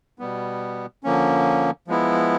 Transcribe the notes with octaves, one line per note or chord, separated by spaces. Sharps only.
B2 G3 B3
D3 F3 A#3 C#4
F3 G#3 B3 E4